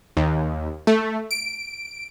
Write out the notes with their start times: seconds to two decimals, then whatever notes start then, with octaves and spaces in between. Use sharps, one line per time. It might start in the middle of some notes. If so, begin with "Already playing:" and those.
0.17 D#2
0.87 A3
1.31 D7